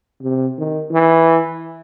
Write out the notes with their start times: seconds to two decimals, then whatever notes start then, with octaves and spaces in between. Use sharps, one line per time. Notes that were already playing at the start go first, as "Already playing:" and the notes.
0.23 C3
0.58 D#3
0.92 E3